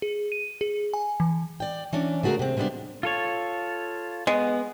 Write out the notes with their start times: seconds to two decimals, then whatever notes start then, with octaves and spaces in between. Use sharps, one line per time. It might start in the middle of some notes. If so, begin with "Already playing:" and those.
0.02 G#4
0.32 D#7
0.61 G#4
0.94 G#5
1.20 E3
1.60 D5 G5
1.93 E3 C#4 D4
2.23 C#3 A3 F#4 G#4 A#4
2.39 C3 C4
2.57 C3 G3 G#3 B3 D4
3.03 F4 A4 C#5
4.27 G#3 B3